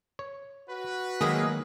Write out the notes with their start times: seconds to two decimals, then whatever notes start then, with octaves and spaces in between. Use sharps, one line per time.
0.19 C#5
0.69 F#4 B4
1.21 D#3 F#3 G#3 A#3 G#4 D#5 E5